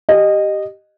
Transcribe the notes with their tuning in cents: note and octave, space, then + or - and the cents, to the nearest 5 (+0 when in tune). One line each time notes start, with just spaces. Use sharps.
G4 -5 D#5 -15